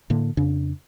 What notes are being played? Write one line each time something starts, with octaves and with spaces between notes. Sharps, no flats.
A2 D3 A#3
F2 C#3 D4